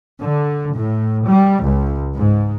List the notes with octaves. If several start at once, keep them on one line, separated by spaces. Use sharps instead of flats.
D3
A2
G3
C#2
G#2